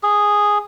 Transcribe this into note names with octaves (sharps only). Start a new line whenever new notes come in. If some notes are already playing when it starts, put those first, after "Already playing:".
G#4